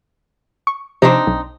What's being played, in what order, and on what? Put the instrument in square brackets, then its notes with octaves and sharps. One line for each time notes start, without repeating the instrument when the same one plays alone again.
[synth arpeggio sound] C#6
[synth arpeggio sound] C3 F3 [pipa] C4 D4 D#4
[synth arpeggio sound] B1